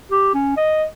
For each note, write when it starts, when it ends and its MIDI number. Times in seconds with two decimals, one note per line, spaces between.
0.11 0.34 67
0.34 0.55 61
0.57 0.84 75